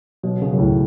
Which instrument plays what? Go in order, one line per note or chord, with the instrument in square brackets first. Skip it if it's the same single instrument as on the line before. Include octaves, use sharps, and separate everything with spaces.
[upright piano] B2 [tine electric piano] F#3
[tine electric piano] C#3
[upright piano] F#2
[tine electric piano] C#2 [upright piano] A2